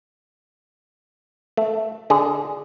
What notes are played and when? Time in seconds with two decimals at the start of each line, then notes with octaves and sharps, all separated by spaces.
1.57 A3
2.10 D3 G#4